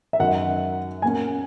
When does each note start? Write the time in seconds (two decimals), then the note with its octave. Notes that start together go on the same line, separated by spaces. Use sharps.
0.13 E5
0.19 F#2 D#3 F#3 F#5
1.02 A#2 A#3 C#4 G#5